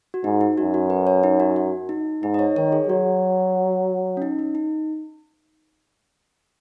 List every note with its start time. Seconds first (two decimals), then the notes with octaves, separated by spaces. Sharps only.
0.14 F#4
0.24 G#2 D#4
0.41 D#4
0.57 F#2 F#4
0.74 F#4
0.90 B4
1.07 C#5
1.23 D#4
1.40 F#4
1.56 F#4
1.89 D#4
2.22 G#2 D#4
2.34 D#5
2.39 C#5
2.56 D#3 C#5
2.72 G#4
2.88 F#3 F#4
4.17 C#4
4.22 D#4
4.39 D#4
4.55 D#4